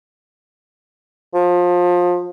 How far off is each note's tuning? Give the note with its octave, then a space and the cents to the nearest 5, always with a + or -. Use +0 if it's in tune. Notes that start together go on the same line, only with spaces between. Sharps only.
F3 +25